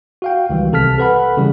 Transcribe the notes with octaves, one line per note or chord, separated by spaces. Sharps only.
F#4 F5 G5
C#2 D#3 E3 G3
B1 C3 A4 A5 F6 B6
A4 B4 F#5 B5
C#3 E3 G3